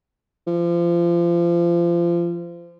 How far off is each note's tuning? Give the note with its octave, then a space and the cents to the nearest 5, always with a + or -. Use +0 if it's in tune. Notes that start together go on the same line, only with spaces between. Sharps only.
F3 -30